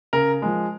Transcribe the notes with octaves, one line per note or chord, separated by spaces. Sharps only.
C#3 A#4
F3 G#3